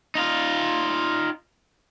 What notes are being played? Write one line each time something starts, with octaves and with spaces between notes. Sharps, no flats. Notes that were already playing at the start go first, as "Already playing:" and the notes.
D#4 F4